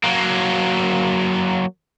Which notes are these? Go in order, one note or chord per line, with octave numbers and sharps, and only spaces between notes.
F#3 A#3